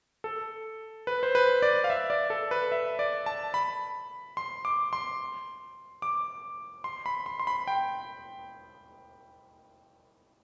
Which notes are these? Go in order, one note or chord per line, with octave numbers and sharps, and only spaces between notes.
A4
B4
C5
B4
D5
F5
E5
D5
A4
B4
E5
D5
A5
B5
C6
D6
C6
D6
C6
B5
C6
C6
B5
G5